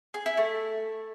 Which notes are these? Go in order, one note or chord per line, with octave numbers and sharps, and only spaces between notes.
G#4
E4
A3